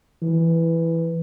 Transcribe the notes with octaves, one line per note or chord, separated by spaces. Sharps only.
E3